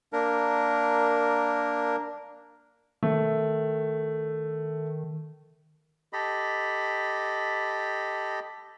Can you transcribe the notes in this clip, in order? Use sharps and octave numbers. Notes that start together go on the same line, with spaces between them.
A#3 D4 A#4
D#3 A3
G4 A4 D#5 B5